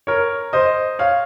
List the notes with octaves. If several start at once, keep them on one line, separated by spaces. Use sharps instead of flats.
A#4 C#5
C5 D#5
C#5 F5